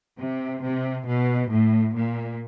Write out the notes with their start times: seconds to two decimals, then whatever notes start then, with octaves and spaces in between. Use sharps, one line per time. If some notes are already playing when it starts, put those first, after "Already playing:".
0.17 C3
0.62 C3
1.06 B2
1.49 A2
1.94 A#2